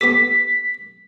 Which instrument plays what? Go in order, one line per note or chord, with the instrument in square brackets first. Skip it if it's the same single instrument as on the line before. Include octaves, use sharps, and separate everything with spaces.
[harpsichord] B3 G4 A4 [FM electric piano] B6